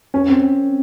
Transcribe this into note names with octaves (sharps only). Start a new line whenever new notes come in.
C#4
C4